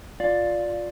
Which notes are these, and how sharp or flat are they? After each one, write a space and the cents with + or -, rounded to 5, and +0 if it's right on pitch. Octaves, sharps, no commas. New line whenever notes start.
F4 +10 D5 +0